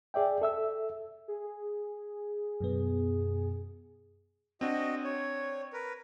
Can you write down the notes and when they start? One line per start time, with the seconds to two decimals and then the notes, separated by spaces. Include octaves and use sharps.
0.14 G#4 D5 E5 G5
0.42 A4 E5 E6
1.28 G#4
2.61 F#2 B2 B3
4.61 C4 D4 F#4 D#5
5.04 C#5
5.73 A#4 B4